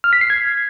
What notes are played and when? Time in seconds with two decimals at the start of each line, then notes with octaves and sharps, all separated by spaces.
0.04 F6
0.13 B6
0.21 C7
0.30 G#6